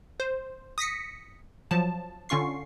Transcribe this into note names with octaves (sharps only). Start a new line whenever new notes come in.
C5
D#6 A#6 B6 C#7
F3 F#3 A5
D3 C#4 F4 C#6 C7